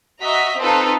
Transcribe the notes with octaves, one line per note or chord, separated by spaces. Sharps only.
F#4 D#5 E5 A#5 B6
C4 D#4 F4 A4 B4